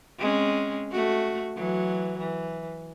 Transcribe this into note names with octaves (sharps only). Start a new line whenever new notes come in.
G#3 C4 C#4
A3 F#4
E3 F#3
E3